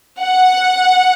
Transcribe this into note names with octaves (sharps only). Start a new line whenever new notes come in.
F#5